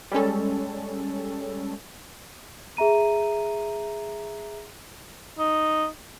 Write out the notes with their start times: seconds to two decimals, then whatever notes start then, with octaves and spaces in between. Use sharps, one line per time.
0.12 G3 G#3 C#4 A4
2.77 G#4 E5 A#5 D#7
5.39 D#4